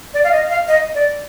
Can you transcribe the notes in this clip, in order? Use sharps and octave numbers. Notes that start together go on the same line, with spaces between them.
D5
F5
D#5
F5
D#5
D5